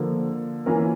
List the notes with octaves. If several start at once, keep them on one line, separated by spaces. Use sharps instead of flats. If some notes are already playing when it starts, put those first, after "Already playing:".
Already playing: D3 F3 A#3
E3 A#3 C#4 F4 A#4